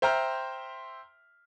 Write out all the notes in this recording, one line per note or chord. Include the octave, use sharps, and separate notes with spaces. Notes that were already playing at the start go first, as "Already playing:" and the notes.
C5 E5 G5 A#5 C6 F6